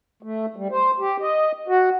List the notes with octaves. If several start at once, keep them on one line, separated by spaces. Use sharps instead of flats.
A3
G3
C5
G4
D#5
F#4